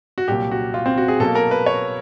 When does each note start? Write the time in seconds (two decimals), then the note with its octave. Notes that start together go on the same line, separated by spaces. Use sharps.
0.18 F#4
0.28 C2 A#2 F#3 G4
0.51 F#4
0.74 F4
0.86 C4
0.98 F#4
1.08 G#4
1.20 B2 F#3 A#3 A4
1.35 A#4
1.51 B4
1.66 C#5